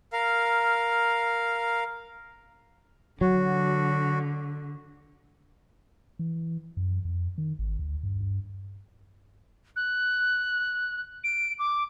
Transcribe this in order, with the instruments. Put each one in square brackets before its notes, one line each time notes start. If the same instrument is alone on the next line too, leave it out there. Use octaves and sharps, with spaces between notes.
[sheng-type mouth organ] A#4 F5
[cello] D3 [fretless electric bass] F#3 [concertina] F#4
[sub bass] E3
F#2
F2
D#3
G#1
D2
G2
G2
[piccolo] F#6
D7
D6